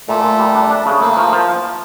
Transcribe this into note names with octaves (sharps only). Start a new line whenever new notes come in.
A#2 A3
A#2
G3
D4
D4
C#3
A3 A#3
F3
F3